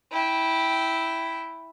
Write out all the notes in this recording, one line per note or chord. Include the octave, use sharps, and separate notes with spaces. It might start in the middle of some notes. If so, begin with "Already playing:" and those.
E4 G5